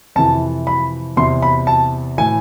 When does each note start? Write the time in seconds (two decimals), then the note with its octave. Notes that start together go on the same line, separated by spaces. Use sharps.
0.16 F2 C3 E3 A5
0.67 B5
1.17 E2 C3 E3 C6
1.42 B5
1.67 A5
2.18 A2 E3 G#5